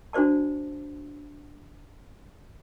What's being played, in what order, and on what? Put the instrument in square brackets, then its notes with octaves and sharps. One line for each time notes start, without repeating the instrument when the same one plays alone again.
[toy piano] D4 F#4 C5 D5 A5